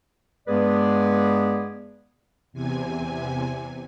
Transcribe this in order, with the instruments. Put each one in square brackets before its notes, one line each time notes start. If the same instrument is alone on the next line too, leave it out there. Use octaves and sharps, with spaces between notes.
[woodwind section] G2 G#3 B3 G#4 B4 D5
[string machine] E2 C3 G#5